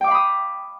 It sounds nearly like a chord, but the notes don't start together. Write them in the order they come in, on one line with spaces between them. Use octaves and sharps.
G5 D6 F5 B5 D#6